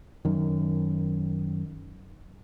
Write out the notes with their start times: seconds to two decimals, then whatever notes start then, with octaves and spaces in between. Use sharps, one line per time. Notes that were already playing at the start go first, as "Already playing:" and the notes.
0.25 F#2 D#3